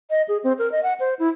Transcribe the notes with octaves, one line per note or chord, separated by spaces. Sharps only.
D#5
G#4
C4
A#4
D#5
F#5
C5
E4